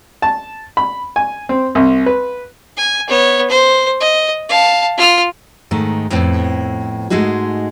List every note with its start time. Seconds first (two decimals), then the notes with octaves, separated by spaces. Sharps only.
0.22 A5
0.77 B5
1.16 G#5
1.49 C4
1.75 C2
2.06 B4
2.77 G#5
3.08 B3 C#5
3.50 C5
4.00 D#5
4.49 F5 A5
4.97 F4 F6
5.71 G#2 D#3 A3
6.10 F2 A2 B3 C4
7.10 G#2 G#3 A3 D#4 F#4 G#4